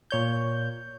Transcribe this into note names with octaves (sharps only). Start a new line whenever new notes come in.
A#2 C#5 G6